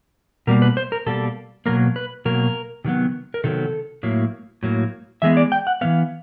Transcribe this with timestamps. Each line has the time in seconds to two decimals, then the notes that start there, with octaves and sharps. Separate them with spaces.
0.47 B2 G3 A#3 A#4
0.62 B4
0.77 C5
0.92 A#4
1.06 B2 G3 A#3 A4
1.66 B2 F#3 A#3 A#4
1.96 B4
2.25 B2 F#3 A#3 A#4
2.84 C3 D#3 F#3 B3
3.34 A#4
3.44 C3 D#3 F#3 B3 A4
4.03 A2 F#3 A#3
4.63 A2 F#3 A#3
5.22 E3 G#3 B3 E5
5.37 D5
5.52 G5
5.67 F#5
5.81 E3 G#3 B3 F5